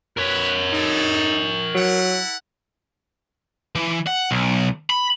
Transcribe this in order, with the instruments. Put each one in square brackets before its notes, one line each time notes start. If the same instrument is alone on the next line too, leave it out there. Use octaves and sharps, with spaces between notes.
[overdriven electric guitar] A#4 C#5 [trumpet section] B4
[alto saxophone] D#4 [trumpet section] G#4 A4
[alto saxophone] F#3 [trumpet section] E4 A4 F#5
[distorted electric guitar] E3
F#5
B1
B5